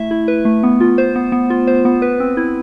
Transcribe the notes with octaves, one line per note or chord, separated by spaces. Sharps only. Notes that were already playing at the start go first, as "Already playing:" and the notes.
Already playing: A3 E4 E5
E4
B4
A3
B3
F4
C5
B3
B3
F4
C5
B3
B4
C4
E4